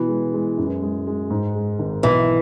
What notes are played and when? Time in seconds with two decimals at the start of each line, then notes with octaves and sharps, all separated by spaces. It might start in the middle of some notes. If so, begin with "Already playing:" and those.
Already playing: B2 E3
0.09 G#3
0.34 G#3
0.58 F#2
0.82 G#3
1.07 G#3
1.30 G#2
1.55 G#3
1.79 G#1
2.03 B1 E3